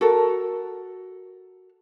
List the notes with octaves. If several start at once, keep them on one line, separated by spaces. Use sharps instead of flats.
F#4 A4 A#4